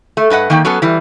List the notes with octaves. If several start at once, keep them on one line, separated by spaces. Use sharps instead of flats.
A3
G2 B4 D#5 F#5
D#3 A#3 G5
F#3 B3 C#4 A4
E3 G3